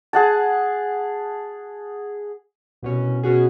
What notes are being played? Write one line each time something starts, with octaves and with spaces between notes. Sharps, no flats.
G#4 F#5 A5
C2 B2 C#4
B2 C#4 F#4 G#4